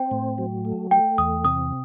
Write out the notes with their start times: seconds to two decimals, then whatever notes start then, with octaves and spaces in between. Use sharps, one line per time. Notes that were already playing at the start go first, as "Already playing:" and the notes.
Already playing: C4 G5
0.11 A2
0.38 F#3
0.65 A3
0.91 A3 G5
1.18 E2 D#6
1.44 C3 D#6